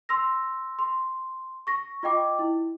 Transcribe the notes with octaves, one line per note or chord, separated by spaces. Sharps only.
C6 E6 A#6
C6
C#6 A#6
F4 D#5 G5 D6
E4